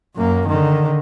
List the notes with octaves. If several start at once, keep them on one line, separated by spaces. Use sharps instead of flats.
F#2 A#3
D3 D#3